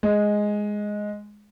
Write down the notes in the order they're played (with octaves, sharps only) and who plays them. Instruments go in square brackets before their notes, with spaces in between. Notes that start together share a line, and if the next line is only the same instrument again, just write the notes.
[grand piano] G#3